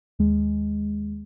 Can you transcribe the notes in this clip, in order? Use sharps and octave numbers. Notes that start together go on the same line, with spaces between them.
D#2 G#3